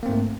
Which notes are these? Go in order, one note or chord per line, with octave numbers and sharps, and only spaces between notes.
G#2 A3 A#3 C4